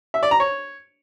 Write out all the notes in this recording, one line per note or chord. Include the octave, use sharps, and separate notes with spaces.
E5
D5
A#5
C#5